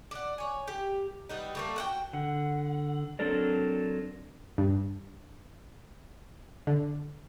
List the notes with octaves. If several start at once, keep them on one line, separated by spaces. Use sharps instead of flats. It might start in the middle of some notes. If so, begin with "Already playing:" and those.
D5 F#5
C#5 G#5
G4
G3 B3 D#4
G3 A3 A#3
F#4 F#5 G5
D3 F#5
F#3 C4 D4 A4 A#4 D5
G2
D3